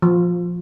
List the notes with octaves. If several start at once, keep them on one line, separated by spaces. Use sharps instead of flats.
F3